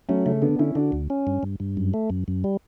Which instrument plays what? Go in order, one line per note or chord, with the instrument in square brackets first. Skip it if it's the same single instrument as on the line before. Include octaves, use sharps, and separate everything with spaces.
[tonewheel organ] F#3 [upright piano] A3 C#4
[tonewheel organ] C#3 [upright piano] A3 C#4
[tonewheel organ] D3 [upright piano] B3 D4
[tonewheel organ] D3 [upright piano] C#4 E4
[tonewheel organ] D3 [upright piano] D4 F#4
[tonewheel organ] D2
C#4
G2
G2
G2
F#2
A3
F#2
F#2
G3